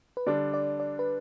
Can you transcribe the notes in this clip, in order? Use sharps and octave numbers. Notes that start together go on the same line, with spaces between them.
B4
D3 G3 D4 D5
D5
D5
B4